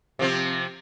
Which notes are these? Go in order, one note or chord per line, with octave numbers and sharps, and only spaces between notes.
C3 F3 C4